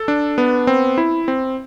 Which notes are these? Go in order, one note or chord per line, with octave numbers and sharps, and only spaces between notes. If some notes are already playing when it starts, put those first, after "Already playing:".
Already playing: A4
D4
B3
C4
E4
C4